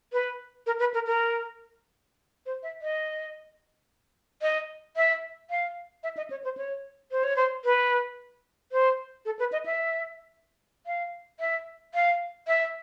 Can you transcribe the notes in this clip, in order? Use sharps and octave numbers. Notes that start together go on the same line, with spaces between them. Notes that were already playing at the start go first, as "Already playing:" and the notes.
B4
A#4
B4
A#4
A#4
C5
E5
D#5
D#5
E5
F5
E5
D#5
C#5
C5
C#5
C5
C#5
C5
B4
C5
A4
B4
D#5
E5
F5
E5
F5
E5